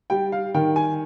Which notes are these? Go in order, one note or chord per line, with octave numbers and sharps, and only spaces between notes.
G3 G5
F5
D#3 G5
G#5